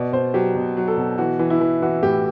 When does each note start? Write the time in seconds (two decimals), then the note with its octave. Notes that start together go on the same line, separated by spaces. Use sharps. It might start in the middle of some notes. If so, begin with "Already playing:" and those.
Already playing: B2 D5
0.13 B2 C5
0.34 F#3 G4
0.55 B2
0.77 F#3
0.88 A4
0.97 B2
1.18 E3 F#4
1.39 E3
1.50 E4
1.61 E3
1.82 E3 F#4
2.03 A2 G4